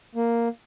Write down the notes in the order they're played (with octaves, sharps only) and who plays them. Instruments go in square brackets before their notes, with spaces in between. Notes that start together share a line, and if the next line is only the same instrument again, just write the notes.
[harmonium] A#3